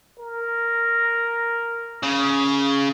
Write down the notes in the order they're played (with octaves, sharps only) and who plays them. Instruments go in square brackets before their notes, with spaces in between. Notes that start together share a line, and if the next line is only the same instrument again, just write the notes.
[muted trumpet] A#4
[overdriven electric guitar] C#3